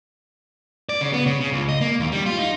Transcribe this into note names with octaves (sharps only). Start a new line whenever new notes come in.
D5
C#3
B3
C#3
C#3
C#2
D#5
A#3
D#2
G3
F4
D#4